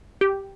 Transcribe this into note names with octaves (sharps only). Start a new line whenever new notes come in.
G4